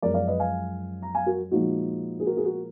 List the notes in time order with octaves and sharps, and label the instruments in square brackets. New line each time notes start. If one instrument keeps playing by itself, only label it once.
[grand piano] F#2 F3 G#3 A#4 D5
D5 F5
B4 D#5
F5 G#5
A#5
F5 G#5
F#4 A#4
A#2 F3 G#3 D#4 F#4
G#4
F#4 A#4
G#4
F#4 A#4